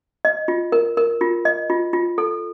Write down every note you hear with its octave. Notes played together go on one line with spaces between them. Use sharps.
D#5
F4
A#4
A#4
F4
D#5
F4
F4
A4